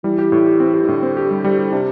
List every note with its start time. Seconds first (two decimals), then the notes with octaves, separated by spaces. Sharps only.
0.04 E3 G3
0.19 G4
0.32 A2
0.46 G4
0.60 C4
0.74 G4
0.83 E3
0.88 A2 D3
1.02 C4
1.17 G4
1.31 G3
1.44 G3
1.59 G4
1.72 C3 D4